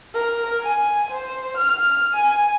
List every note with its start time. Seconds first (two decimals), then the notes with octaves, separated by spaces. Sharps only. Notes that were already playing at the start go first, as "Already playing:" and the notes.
0.15 A#4
0.62 G#5
1.11 C5
1.57 F6
2.14 G#5